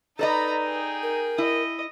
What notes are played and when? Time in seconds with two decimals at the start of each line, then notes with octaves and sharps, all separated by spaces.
0.19 D#4 A4 B4 D5 D#5 A#5 B5
0.64 G#4 G5
1.03 A#4
1.38 E4 D#5